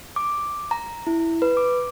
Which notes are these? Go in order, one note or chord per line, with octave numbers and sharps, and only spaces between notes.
D6
A#5
E4
B4
D6